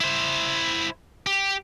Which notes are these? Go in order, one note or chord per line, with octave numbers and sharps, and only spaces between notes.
E4 C5
G4